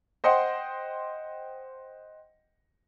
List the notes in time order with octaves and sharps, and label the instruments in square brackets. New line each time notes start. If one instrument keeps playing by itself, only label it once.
[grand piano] C5 D#5 F#5 G5 C6